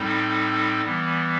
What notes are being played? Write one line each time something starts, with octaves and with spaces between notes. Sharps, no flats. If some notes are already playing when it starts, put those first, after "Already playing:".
Already playing: A2 G3 C4 D#4 A4
E3 G3 B3